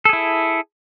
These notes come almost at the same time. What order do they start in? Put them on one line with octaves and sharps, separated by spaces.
A4 G#4 E4